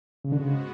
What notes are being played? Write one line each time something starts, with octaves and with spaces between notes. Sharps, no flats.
G#2 C#3 G#3 B3 F#4
D3
C#3